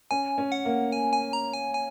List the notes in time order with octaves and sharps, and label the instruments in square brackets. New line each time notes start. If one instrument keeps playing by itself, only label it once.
[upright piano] C#4 [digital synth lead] G#5
[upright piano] C#4
[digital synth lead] F#5
[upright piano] A#3
[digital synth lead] G#5
G#5
A#5
G#5
G#5